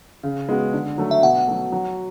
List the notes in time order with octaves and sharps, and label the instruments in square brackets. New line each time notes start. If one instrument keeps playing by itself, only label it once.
[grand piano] C#3
G#3 B3 F#4
D3
F#3 A3
[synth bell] E5
[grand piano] B2 [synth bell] F#5
[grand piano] F#3 A3
F#3